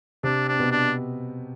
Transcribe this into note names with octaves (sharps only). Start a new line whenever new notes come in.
C3 C4 D4
C4 D4
B2 B3
D4